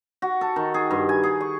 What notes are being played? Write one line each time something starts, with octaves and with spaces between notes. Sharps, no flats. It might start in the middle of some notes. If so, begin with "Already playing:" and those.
F#4
A4
D#3
G#4
G2
G#5
G#4
C#6